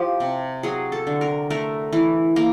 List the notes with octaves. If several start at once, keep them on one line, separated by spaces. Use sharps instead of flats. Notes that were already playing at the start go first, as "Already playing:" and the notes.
Already playing: F3 G4
C3
F#3 G#4
A4
D3
A#4
A3 A#4
E3
A#3